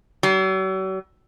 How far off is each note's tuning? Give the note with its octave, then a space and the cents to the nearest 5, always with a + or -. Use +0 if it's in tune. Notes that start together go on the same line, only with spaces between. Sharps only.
F#3 +45